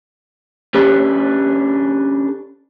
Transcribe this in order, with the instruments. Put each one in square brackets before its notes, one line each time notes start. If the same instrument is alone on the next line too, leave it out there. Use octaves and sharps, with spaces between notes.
[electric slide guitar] C#4 D4 G4 A4 B4